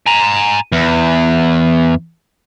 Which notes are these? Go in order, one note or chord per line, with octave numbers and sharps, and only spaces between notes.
G#5 A#5
E2